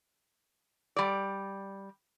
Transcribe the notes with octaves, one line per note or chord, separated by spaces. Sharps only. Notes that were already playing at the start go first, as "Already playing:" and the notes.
G3 D5